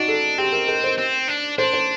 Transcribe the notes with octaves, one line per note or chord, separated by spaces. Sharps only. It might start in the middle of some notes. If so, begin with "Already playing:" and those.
Already playing: D4 D#4 F#4
A4
C4 G4
A#4
A#4
C5
C4
D4
D4 C5
C5